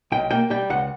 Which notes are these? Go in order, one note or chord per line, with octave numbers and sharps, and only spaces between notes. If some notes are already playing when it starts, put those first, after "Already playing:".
B1 G5
A#3 G5
G3 G5
C#2 F#5